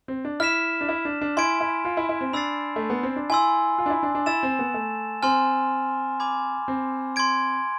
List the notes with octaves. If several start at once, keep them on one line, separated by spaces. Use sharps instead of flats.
C4
D4
E4 F6 B6 E7
D4
E4
D4
D4
E4 G#5 C6 G#6 D7
E4
F4
E4
E4
C4
D4 B5 E6 A6 C7
A3
B3
C4
D4
E4 G#5 C6 E6
F4
D4
E4
D4
D4
E4 C6 E6 A6 E7
C4
B3
A3
C4 G#5 C6 F6
G#5 B5 D6 G#6
C4
C6 G#6 D7